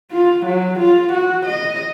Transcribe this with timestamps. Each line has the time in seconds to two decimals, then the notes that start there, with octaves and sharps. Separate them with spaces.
0.13 F4
0.46 F#3
0.80 F4
1.13 F#4
1.46 D#5